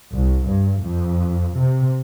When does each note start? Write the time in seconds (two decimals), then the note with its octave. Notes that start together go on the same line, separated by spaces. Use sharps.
0.16 C2
0.50 G2
0.83 F2
1.58 C3